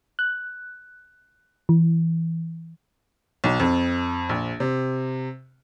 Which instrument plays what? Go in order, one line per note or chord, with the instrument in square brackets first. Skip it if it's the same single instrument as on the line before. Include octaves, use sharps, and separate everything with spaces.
[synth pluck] F#6
E3
[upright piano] B1
F2
A#1
C3